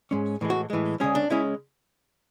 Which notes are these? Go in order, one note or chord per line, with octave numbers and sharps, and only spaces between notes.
G#2 G#3 C#4
A2 E3 G#3
F#4
A2 E3 G#3
D2 C#3 G#3 C#4 G#4
D4
C#3 G#3 C#4 E4